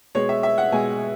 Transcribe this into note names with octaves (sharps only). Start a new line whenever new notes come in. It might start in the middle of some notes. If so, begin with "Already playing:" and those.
B2 G#3 C#5
E5
E5
F#5
B2 G#3 G#5